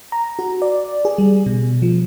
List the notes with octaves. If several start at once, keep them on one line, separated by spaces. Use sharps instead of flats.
A#5
F#4
D5
G#4
G3
B2
F3